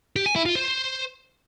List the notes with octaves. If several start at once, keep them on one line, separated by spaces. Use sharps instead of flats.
G4
G#5
E4
F4
C5